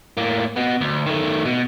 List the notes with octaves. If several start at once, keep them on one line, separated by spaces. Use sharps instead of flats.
A2 A#3
B2 B3
D2
D#3 A3
B2